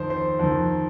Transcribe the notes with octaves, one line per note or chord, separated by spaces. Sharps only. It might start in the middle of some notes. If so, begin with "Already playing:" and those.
Already playing: F2 D#3 C5
C5
F2 D#3